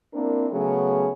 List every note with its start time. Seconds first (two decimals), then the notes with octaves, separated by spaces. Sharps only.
0.14 A#3 C4 D4 E4 A#4
0.51 C#3 F#3 A3 B3 C#4 G#4